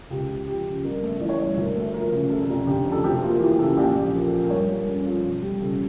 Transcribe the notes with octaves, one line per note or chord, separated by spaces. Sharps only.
C#2 G4
C#2
F3 G4
C#3
G1 A#4
A3
E3 D5
C#5
G2 D5
D2 A#4
A3
F3 A#4
C#3
F1 A4
F1
D3 G4
F2
A4
D2 G4
A#3 F4
E3 G4
G4
C#3 A4
A#1 G4
A#1
F3 A#4
A4
A#2 A#4
A#4
G2 C#5
G2 A#4
C#4 A4
F3 A4
E1 F4
G3 G4
C#3 A4